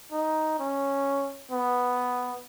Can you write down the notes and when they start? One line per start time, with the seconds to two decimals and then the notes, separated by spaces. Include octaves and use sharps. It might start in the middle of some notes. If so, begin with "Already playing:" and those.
0.12 D#4
0.59 C#4
1.51 B3